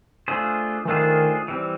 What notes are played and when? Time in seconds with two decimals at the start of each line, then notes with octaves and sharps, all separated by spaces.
0.28 A3 D4 F4 G#4 C5
0.85 E3
0.88 D#3 A3 D4 F4 G#4 C5
1.48 E3 G3 C4